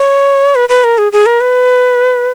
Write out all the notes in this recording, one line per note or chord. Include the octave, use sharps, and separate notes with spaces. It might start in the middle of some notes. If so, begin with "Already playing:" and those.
Already playing: C#5
B4
B4
A#4
G#4
G#4
A#4
B4